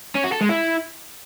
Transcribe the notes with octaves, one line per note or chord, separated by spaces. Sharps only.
C#4
F#4
A4
G#3
E4